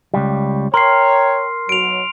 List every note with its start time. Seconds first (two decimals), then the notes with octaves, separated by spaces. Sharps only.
0.14 C#2 G3
0.74 A#4 C#5 G5 C6 F6 C7
1.69 B1 F#3 D7 F7